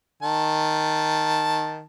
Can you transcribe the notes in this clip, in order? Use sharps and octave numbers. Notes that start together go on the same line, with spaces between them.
D#3 A5